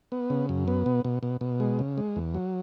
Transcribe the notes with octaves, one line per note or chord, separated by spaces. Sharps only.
B3
C#3
F#2
B3
B2
B2
B2
B2
G#3
C#3
G#3
E2
F#3